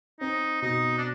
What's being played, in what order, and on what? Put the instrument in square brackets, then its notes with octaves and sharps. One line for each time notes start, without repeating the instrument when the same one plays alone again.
[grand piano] C4 [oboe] D#4
[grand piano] B2 [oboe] D#4
[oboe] D4